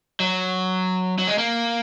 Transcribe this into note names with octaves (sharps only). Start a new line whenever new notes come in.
F#3
F#3
G#3
A#3